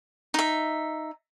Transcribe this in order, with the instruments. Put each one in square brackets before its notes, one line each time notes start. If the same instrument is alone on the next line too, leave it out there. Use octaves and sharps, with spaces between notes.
[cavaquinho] D#4 E5